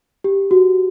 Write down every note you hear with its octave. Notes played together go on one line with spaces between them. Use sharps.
G4
F#4